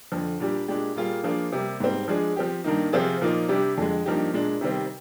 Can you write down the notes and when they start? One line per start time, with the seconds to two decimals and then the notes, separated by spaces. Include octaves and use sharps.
0.12 F2 D3 F3
0.40 A#2 G3 D4 G4
0.68 A#2 G#3 D4 G4
0.96 A#2 G3 A#3 F4 G#4
1.24 F3 A#3 D4 F4 G#4
1.52 C3 G3 A#3
1.80 G#2 G3 C4
2.08 F3 G#3 D4 G#4
2.36 F3 C4 G4
2.64 G2 D#3 A#3 D#4
2.93 C3 F3 C4 F4 G#4
3.21 A#2 F3 A#3 D#4
3.48 C3 G3 D4 G4
3.78 F2 D3 G#3
4.06 G2 F3 A#3 D#4 G4
4.34 A#2 G#3 D4
4.61 C3 D#3 G3 C4